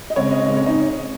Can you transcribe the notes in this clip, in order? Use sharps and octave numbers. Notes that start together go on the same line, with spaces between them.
D#5
C#3 G#3 C4 C#5
D#5
C#3 G#3 C4
C#5
D#4